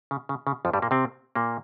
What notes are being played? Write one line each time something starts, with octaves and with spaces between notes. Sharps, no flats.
C#3
C#3
C#3
F2 F3
G2 G3
A#2 A#3
C3 C4
A#2 A#3